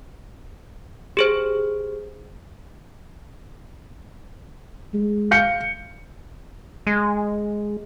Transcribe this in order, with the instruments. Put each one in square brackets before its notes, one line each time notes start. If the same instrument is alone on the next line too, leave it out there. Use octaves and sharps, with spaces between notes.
[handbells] G4 G#4 C5
[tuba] G#3
[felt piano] F5 G6 C#7
[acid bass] G#3